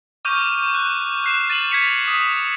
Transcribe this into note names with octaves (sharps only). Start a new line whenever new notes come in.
C#6 D6 F6 G6 D#7 F7
F#6
F#6 C7 E7
A6 D#7 E7 F#7
G#6 B6 C#7 F7
D#6